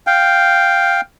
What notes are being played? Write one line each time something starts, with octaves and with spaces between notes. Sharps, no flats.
F5 G5